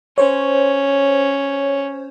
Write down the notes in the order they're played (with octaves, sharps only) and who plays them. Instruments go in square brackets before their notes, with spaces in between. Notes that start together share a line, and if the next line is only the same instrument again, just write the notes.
[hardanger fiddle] C#4 [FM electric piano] C5 C#5